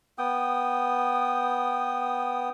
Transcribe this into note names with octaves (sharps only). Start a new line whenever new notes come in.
B3 G5 D#6